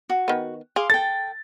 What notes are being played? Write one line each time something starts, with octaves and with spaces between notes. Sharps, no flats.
F#4
D#3 B3
G#4 F5 C6 D6
A4 G5 A6